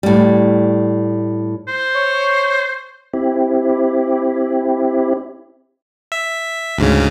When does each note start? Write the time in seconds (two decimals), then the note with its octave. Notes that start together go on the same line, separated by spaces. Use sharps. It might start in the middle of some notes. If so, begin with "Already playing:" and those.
0.03 A2 G3
1.68 C5
1.95 C#5
3.14 C4 E4 G4
6.12 E5
6.78 D2 G#2 C#3